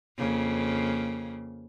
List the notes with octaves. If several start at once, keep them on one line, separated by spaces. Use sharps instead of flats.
F2 C#3 A#3